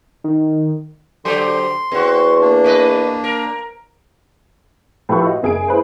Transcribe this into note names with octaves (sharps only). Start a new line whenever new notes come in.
D#3
D3 F#3 G4 C5 C6
E2 C4 F#4
A#3 D4
A2 B4 D#5
A#4
A2 F3 G4 A4 B4 C#6
F#4 D#5
F#1 G#4 G#5 D7
E4 G#4 B4 C5